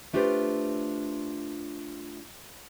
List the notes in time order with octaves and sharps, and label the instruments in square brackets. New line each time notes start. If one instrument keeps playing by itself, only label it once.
[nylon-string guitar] A3 D4 F4 G4 B4 C5